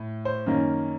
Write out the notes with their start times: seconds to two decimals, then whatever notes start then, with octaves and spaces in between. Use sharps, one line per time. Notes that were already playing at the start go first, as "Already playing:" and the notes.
Already playing: A2
0.25 C5
0.46 F#2 D#3 A#3 C#4